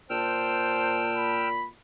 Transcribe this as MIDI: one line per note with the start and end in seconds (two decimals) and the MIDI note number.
0.10 1.74 46
0.10 1.11 72
0.10 1.48 79
0.10 1.33 81
0.10 1.48 88
0.10 1.48 89
1.16 1.67 83